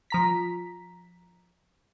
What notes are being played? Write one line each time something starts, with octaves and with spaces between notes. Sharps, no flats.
F3 A#5 B6